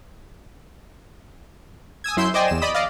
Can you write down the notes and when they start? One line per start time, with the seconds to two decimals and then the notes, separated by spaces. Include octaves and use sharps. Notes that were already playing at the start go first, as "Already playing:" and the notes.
2.04 G#5 D#6 E6 G#6
2.17 F#2 E4 C6 E6 G6
2.34 C5 D5 D#5 G5 G#5
2.48 E2 E7
2.62 D5 D#5 B5 D#6
2.75 D5 D#5 F5